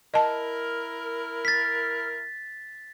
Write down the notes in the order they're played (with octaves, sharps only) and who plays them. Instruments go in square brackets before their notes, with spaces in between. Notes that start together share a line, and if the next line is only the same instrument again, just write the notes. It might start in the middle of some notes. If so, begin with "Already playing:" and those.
[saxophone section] E4 A#4 [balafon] D#5 A5
[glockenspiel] A6 B6